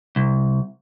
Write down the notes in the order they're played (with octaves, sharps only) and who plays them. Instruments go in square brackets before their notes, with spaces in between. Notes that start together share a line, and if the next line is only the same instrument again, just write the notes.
[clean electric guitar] C2